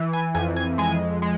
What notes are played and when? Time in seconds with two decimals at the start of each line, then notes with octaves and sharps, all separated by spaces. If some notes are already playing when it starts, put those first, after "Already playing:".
Already playing: E3
0.13 G#5
0.35 F2 G#5
0.56 G#5
0.78 G#3 G#5
1.22 G#3